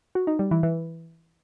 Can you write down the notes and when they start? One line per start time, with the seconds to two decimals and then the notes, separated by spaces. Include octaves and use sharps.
0.15 F#4
0.27 D#4
0.39 G3
0.51 E3
0.63 E3